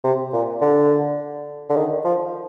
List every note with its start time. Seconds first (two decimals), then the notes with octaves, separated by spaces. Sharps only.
0.04 C3
0.33 A#2
0.61 D3
1.70 D3
1.77 D#3
2.05 F3